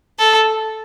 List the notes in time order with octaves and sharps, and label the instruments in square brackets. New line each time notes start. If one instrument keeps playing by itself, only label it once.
[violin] A4